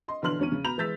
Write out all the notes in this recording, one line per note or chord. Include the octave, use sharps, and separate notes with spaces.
D#5 C6
B1 D3 E3 C6 F6 F#7
E2 C#4 D#7
C#3
B2 B3 A#5 B5 G6 F7
E3 G#3 E6 G6 A6 B6